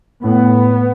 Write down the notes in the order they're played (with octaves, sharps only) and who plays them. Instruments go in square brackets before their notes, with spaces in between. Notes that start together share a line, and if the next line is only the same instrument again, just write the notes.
[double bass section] A2 B3